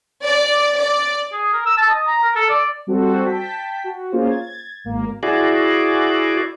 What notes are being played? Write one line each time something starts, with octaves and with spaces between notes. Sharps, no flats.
D5
D5
G#4
A#4
E6
A5
D#5
A#5
A#4
A4
D5
G3 C4 F#4 A4 C5
G5 A5 B6
F#4
A#3 C#4 F4 G#4 C5
G#6 A6
G#1 A#3
E4 F#4 G#4 D5